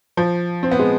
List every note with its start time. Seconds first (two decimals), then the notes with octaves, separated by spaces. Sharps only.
0.17 F3
0.63 C4
0.71 B3
0.79 G#3